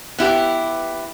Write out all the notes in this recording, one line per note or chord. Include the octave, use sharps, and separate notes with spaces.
B3 E4 G4